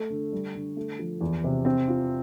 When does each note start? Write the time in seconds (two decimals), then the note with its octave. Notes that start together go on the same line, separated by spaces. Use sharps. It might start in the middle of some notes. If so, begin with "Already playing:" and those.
Already playing: A3
0.10 D3
0.32 G3
0.55 D3
0.77 A3
0.99 F3
1.21 E2
1.44 C3
1.65 C4
1.88 F4